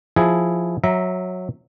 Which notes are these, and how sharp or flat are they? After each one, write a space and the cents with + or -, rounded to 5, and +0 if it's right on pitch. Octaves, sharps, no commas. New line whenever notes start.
F3 +0 E4 +0 G#4 +0
F#3 -15 E5 -15 A#5 +0